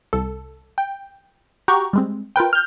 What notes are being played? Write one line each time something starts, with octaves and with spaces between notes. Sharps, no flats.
C2 A4
G5
F#4 G4 F#5 G5 A#5 C#6
G3 G#3 C4
F4 A#4 B4 G5
F6 G6